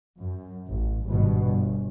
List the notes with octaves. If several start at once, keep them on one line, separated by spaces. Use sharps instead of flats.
F#2
A1
G#1 G2 B2
G1